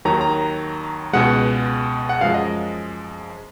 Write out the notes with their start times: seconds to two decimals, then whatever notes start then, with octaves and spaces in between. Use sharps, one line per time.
0.05 D#2 D#3 F#3 A#5
0.21 A#5
1.13 C#2 B2 G#3 F#5
2.09 F#5
2.21 F#2 F3 G#3 F5
2.34 D#5